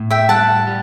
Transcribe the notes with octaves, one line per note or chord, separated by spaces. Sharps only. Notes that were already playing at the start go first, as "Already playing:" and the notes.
Already playing: A2
E5 G5
G3 F#5 A5
G4